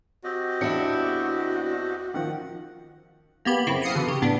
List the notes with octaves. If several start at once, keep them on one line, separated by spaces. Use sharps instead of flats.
C4 F#4 G4 D#5
E2 D4 E4 C#7
D#3 F3 F#5
A#3 B3 G4 B5
F#2 C#3 C4 E4 B5
F5 D#6 C7 C#7 D#7
B2 D3 E3
C#3 G4
A2 B3 D4